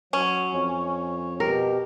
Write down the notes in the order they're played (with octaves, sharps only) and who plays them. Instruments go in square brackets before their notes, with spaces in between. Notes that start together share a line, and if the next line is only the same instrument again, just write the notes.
[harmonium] F#3 [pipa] C#4
[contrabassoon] F2 [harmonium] C#5
[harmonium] B2 G4 [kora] A#4